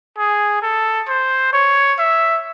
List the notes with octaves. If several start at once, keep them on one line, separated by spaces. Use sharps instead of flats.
G#4
A4
C5
C#5
E5